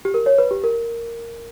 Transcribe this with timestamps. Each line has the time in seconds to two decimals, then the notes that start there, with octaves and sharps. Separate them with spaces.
0.05 G4
0.14 A#4
0.26 C#5
0.38 B4
0.51 G4
0.64 A#4